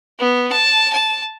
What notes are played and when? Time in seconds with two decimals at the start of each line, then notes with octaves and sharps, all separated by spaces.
0.20 B3
0.52 A5
0.93 A5